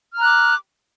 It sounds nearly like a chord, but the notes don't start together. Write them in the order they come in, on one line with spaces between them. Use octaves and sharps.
F6 A#5 F#6 D6